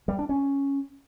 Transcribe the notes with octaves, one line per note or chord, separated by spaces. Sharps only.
G3
D4
C#4